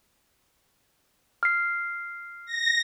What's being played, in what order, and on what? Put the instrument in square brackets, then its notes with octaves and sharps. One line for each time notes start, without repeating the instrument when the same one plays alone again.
[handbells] F6 C7
[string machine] A#6